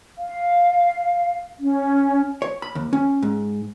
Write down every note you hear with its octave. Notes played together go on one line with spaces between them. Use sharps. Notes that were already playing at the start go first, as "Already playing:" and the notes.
F5
C#4
C#5
B5
D#2
C#4
G#2